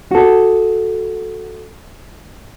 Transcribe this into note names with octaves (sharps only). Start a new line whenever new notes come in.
F#4 A4